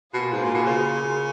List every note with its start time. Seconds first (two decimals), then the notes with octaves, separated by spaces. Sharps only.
0.14 B2 A#3 F4 G#4
0.33 G#2
0.44 A#2
0.55 B2
0.66 C#3